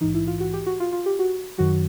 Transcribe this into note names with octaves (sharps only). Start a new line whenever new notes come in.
A#1 G#2 E3 D#4
E4
F4
F#4
G4
F#4
F4
F4
G4
F#4
F#2 D#3 F#3 F#4